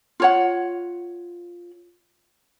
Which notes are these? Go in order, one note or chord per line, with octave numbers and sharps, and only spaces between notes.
F4 C#5 F#5